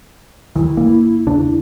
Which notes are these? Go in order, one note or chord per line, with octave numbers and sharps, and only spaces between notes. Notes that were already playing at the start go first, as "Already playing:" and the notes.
D#2 D#3 E3 E4
G1 A#3
E2 C#3 D4